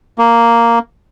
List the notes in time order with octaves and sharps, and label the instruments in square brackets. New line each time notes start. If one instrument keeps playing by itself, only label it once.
[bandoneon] A#3